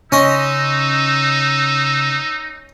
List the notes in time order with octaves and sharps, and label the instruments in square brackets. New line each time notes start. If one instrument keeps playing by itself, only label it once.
[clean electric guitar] C#3 C6 [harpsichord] C#4 D#5 [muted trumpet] D#4 [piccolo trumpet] E6